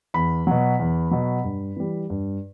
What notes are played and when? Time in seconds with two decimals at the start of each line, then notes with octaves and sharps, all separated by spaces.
0.14 E2 B5
0.47 B2 F#3
0.79 E2
1.11 B2 F#3
1.44 G2
1.76 E3 G3
2.10 G2